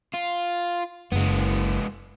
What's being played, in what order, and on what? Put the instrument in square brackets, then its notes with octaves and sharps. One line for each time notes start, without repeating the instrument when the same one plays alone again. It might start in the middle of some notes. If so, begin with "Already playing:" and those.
[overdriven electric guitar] F4
[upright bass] F#1 [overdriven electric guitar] G#3 B3